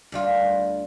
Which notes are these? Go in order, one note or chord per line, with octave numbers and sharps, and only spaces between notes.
D2 G3 F4